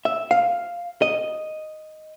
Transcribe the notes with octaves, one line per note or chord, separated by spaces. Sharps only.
E5
F5
D#5